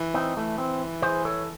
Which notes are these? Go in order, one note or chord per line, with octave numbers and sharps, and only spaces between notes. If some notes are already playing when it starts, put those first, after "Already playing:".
Already playing: E3
C4 D#4
E3 A3
C4
G#4 C5
A4 C#5